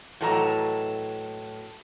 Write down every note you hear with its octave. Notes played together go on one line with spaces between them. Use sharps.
A2 E3 F#3 A4 D#5 A#5